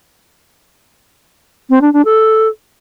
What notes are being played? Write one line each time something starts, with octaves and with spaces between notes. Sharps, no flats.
C4
D4
D4
A4